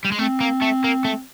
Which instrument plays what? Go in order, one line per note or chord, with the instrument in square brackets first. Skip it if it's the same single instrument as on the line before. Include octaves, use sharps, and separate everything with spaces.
[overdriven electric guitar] G3
G#3
[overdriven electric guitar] A3 [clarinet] C4
[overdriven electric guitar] A#3
A3
A#3
A3